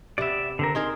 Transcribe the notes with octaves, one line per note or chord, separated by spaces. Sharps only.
C3 B3 D5 E5
D3 C4 A#4
D#4 G#4 A#4 C6